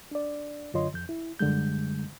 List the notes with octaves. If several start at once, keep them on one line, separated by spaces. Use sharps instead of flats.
D4 D5
F#2 D3 F4 C#5 D#5 C6
F2 G6
E4
F#2 D3 G3 G#3 G6